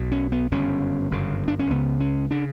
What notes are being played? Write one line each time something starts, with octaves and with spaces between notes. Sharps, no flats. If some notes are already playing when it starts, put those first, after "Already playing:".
Already playing: B1 B2
C#4
B3
G1 F#2 C#3 C#4
G1 F#2 C#3
D4
C#4
C#2 C#3 B3
C#4
C#3 D4